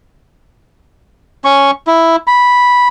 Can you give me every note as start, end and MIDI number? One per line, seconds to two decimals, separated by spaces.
1.45 1.71 61
1.45 1.71 85
1.87 2.16 64
2.27 2.88 83